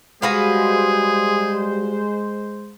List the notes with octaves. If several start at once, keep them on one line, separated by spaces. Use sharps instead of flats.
G3 G#3 F#4 G#4 B4 C5 F5